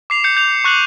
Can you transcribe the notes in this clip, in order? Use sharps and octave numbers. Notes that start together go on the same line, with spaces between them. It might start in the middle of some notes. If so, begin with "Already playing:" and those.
D6 C7 F7
G6 C#7
G6 F7
C#6 F#6 C7 F#7